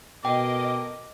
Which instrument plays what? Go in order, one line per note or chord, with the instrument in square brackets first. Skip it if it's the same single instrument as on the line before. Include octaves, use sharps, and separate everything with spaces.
[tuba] B2 [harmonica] A4 A#4 D6 [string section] D#5 [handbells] G5